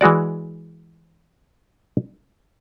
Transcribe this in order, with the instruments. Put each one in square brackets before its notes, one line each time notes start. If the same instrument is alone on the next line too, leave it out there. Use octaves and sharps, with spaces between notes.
[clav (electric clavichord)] E3 G#3 F#4 D5